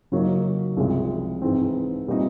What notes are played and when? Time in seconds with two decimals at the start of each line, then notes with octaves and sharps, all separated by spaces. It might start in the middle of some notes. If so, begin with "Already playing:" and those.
0.12 C#3 F#3 A#3 D#4
0.77 C2 C3 F3 G#3 C#4
1.42 G#2 E3 G#3 C4
2.08 A#2 G3 C4 D#4